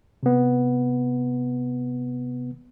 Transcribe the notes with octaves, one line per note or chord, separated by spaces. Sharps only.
C3 B3